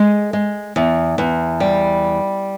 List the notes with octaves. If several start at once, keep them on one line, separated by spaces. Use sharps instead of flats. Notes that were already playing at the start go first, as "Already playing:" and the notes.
Already playing: G#3
G#3
E2
E2
G3